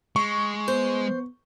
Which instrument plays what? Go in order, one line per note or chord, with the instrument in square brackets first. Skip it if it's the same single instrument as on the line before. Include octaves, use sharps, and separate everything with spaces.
[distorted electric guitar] G#3 [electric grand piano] C#6
[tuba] B3 [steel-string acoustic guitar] C5